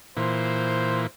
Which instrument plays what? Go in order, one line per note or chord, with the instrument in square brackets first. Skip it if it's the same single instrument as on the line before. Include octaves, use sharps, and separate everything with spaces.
[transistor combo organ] A#2 E3 [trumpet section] C5